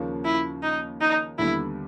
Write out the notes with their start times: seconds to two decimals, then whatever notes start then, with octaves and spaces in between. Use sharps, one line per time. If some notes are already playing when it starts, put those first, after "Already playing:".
Already playing: D#2 C#3 F3 A#3 C#4
0.25 E4
0.63 D#4
1.01 D#4
1.39 D#2 D3 G3 B3 E4